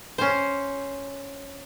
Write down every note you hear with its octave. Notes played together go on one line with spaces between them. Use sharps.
C#4 C5